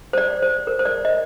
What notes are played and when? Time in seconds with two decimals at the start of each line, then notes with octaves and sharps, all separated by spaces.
0.13 C5
0.18 D5
0.42 C5
0.67 A#4
0.79 C5
0.85 D5
1.05 D#5